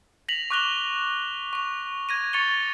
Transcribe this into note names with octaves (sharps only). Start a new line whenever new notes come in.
A#6 B6 F7 F#7
C#6 D6 F#6 A#6 F7 G7
C#6 F7
G#6 A#6 D#7
C#6 A6 C#7 F7 G7